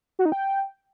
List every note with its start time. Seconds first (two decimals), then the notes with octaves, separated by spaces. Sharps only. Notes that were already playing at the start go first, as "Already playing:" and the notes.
0.19 F#4
0.25 D#4
0.32 G5